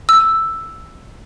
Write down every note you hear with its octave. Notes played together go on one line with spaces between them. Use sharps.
E6